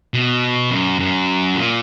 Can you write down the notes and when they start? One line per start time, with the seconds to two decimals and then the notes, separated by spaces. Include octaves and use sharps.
0.14 B2
0.71 F#2
1.00 F#2
1.56 A#2